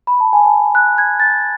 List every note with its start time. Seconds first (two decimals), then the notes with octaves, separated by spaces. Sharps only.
0.07 B5
0.20 A5
0.33 G#5
0.46 A5
0.75 F#6
0.98 G#6
1.20 A6